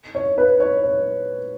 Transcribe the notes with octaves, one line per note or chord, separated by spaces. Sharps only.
C#5
B4
C#5
C#5